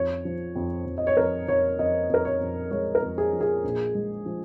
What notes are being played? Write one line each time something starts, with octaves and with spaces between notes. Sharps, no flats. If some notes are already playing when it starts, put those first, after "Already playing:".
Already playing: F2 C#5
F3
F2
F2
D#5
C#5
F2 A#4
F2 C#5
F2 D#5
F2 A#4
C#5
F2
G#3 C#5
A#4
F2
G#4
F3
G#4
A#1
G#3
F3